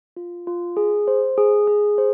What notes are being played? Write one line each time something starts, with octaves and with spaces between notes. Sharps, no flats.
F4
F4
G#4
C5
G#4
G#4
C5